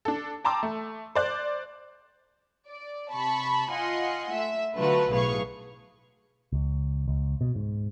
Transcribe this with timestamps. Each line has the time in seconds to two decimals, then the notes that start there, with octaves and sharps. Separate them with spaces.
0.05 D4 A4
0.44 G5 A5 A#5 C6 D6 E6
0.63 A3
1.15 C5 D5 F#6
2.68 D5
3.11 C3 A5 B5 C#6
3.71 F4 D#5 F#5 G#5 C6
4.33 A3 E5
4.77 D3 F#3 A3 F4 F#4 B4
5.11 B1 A2 G#4 B4 F5 C#6
6.53 C#2
7.08 C#2
7.41 B2
7.55 G#2